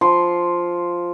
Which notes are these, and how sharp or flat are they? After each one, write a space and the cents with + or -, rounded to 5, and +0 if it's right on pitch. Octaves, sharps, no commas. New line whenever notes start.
F3 +0 C6 +0